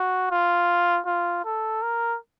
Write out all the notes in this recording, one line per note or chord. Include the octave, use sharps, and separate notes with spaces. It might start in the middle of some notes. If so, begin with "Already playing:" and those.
Already playing: F#4
F4
F4
A4
A#4